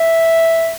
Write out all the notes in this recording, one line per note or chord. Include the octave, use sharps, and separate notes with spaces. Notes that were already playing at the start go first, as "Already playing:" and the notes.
Already playing: E5